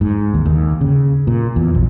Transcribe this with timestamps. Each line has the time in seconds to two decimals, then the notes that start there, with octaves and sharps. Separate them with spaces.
0.01 G#2
0.34 D#2
0.45 D#2
0.81 C#3
1.27 A#2
1.56 E2
1.75 A#1